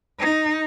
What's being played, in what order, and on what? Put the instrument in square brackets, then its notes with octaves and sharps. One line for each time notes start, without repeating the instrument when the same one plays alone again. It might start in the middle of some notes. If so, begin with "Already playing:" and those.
[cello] D#4